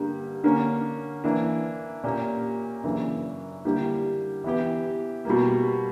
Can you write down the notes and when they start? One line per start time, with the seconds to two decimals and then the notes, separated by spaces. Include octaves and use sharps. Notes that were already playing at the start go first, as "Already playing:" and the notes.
Already playing: G2 D3 G3 A#3
0.44 D3 A#3 C#4
1.24 E3 A#3 D4
2.04 A#2 A#3 C#4 G4
2.84 F#2 C#3 E3 A#3 D4
3.65 D3 G3 A#3 E4 G4
4.44 E3 B3 E4 G4
5.25 B2 G3 A#3